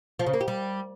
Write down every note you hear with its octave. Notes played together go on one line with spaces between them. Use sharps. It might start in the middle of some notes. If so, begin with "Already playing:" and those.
F3
C#3
A#3
G4
G3